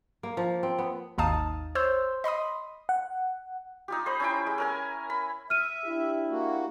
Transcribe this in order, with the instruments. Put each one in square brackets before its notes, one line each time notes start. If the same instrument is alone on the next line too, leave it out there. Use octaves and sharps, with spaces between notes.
[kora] A#3
F3
C4
B3
[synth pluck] G#1 D#2 D#4 F5 A5 D#6
C5 C#5 C6 E6 G6
D#5 B5 C6 D#6
[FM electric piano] F#5
[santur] D#4 F4 G4
C5 D#5 B5
C#4 E4 G5
G#3
C#4 A#4 G#5
B5
[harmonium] E5 [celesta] F6 D#7
[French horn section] D4 E4 G4
[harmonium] A#3 F#4